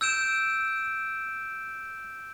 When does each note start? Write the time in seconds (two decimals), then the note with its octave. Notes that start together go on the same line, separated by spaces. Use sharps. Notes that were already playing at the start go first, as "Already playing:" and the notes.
0.01 E6 G6 D7 E7